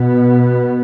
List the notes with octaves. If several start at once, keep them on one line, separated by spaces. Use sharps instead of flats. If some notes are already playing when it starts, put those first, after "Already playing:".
Already playing: B2 B3